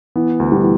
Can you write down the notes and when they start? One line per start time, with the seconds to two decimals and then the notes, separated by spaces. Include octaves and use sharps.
0.16 E3 B3
0.40 D2
0.52 G3
0.62 E3